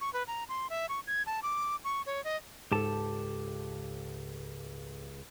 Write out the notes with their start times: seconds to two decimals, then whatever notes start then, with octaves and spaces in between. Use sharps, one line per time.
0.01 C#6
0.13 B4
0.27 A#5
0.49 C6
0.70 E5
0.89 C#6
1.07 G#6
1.26 A5
1.43 D6
1.84 C#6
2.06 C#5
2.24 D#5
2.71 C#2 G#2 G4 A4 A5